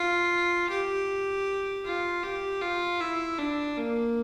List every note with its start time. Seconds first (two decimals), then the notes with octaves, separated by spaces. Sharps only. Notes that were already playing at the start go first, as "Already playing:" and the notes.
Already playing: F4
0.70 G4
1.85 F4
2.23 G4
2.62 F4
3.00 E4
3.38 D4
3.78 A#3